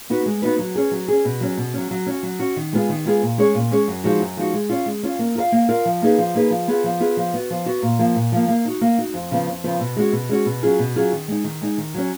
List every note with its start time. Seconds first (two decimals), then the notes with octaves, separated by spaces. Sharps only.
0.10 B3 D#4 F#4 B4
0.26 G#3
0.42 B3 D#4 F#4 B4
0.59 F#3
0.75 C#4 G#4
0.91 F#3
1.08 C#4 G#4
1.25 B2
1.41 F#3 C#4
1.57 B2
1.74 F#3 C#4
1.91 F#3
2.06 C#4 F#4
2.23 F#3
2.40 C#4 F#4
2.56 D#3
2.73 G#3 B3 F4 G#4
2.89 D#3
3.05 G#3 B3 F4 G#4
3.22 A#2
3.38 G#3 C#4 G#4 C#5
3.55 A#2
3.71 G#3 C#4 G#4 C#5
3.88 F#2
4.04 F3 G#3 D#4 F#4
4.20 F#2
4.37 F3 G#3 D#4 F#4
4.54 G#3
4.69 C#4 F4
4.86 G#3
5.03 C#4 F4
5.19 A#3
5.35 F4 A#4 F5
5.52 A#3
5.69 F4 A#4 F5
5.85 F3
6.02 A#3 D#4 G#4 B4
6.18 F3
6.35 A#3 D#4 G#4 B4
6.50 F3
6.68 B3 F4 G#4
6.84 F3
7.00 B3 F4 G#4
7.17 F3
7.34 B3 F#4
7.50 F3
7.66 B3 F#4
7.82 A#2
7.99 F3 A#3
8.15 A#2
8.32 F3 A#3
8.48 A#3
8.65 D#4 F#4
8.81 A#3
8.98 D#4 F#4
9.14 F2
9.31 C#3 F3 B3
9.47 F2
9.64 C#3 F3 B3
9.80 B2
9.96 G#3 C#4 F#4
10.12 B2
10.29 G#3 C#4 F#4
10.46 B2
10.63 F#3 C#4 F4 G#4
10.79 B2
10.96 F#3 C#4 F4 G#4
11.12 D#3
11.28 G#3 D#4
11.44 D#3
11.62 G#3 D#4
11.78 D#3
11.94 F#3 C#4